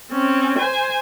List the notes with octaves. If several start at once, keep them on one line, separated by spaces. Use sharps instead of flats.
C4 C#4
C5 G#5